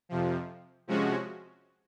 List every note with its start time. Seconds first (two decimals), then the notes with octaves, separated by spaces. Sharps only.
0.09 F2 C3 F3
0.87 C3 F3 G#3 C#4 F#4